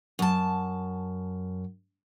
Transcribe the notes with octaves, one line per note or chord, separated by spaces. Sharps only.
F#2 A5